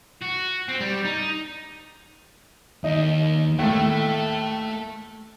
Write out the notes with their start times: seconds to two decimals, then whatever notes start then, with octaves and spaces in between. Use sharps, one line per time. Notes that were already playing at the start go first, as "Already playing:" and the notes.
0.22 F#4
0.68 C4
0.80 G3
1.05 D#4
2.84 D#2 D#4
3.59 D#2 A2 A3